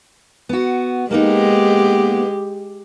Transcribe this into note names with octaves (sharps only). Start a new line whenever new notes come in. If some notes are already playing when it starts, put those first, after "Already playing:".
B3 F#4
G#3 A#3 B3 D#4 G4